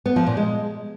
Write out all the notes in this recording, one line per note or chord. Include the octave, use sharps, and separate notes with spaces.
B3
F3
A#2
G#3